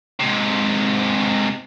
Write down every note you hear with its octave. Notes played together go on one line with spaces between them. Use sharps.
G#2 C3